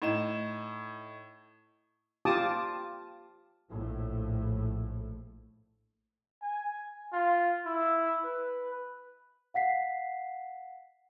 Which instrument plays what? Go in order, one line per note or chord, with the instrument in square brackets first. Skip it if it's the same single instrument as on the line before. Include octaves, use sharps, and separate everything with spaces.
[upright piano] A2 D#4 E7
[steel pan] F4 G4 A5 D6 D#6
[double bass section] A#1 A2
[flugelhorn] G#5
F4
E4
B4
[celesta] F5 F#5 B6 C7